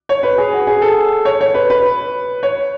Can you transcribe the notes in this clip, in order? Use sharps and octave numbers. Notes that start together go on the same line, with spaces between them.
C#5
B4
G#4
F#4
G#4
A4
C#5
C#5
B4
B4
C#5